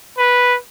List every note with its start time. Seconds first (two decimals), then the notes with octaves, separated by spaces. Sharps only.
0.18 B4